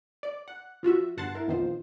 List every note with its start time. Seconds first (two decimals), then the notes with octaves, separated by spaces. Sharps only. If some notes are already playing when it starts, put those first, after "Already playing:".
0.23 D5
0.48 F#5
0.83 F3 F4 F#4 E5
1.17 G1 G2 F#5 A5 C6 A6
1.34 E4 A#4
1.48 A#1 E2 D#3 B3 F4 C5